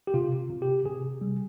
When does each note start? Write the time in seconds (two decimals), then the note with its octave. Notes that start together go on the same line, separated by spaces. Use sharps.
0.07 G4
0.14 C3 F4
0.50 C3
0.62 G4
0.85 C3 G#4
1.21 G3